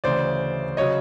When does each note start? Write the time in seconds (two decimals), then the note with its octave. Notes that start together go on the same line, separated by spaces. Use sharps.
0.04 D2 C#3 E3 C5 D5
0.77 C#3 F#3 C#5 D#5